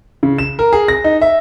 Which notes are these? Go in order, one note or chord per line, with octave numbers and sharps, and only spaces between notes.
C#3
E7
A#4
G#4
A#6
D#4
E5